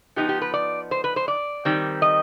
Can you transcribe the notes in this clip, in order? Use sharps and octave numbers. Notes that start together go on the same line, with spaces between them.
F3 B3 D#4 G4
G4
B4
D5
C5
B4
C5
D5
D#3 G3 C4
D#5